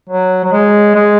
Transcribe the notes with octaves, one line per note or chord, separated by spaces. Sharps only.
F#3
F#3
G#3
G#3